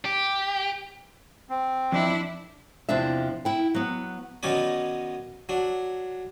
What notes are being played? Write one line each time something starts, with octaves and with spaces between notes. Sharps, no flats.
G4
C4
F2 D4 E4
E2 C3 F3 D4 E5
E4 G5
F#3 B3
D#3 F#3 B3 C#4 D#4 D5
F#3 D4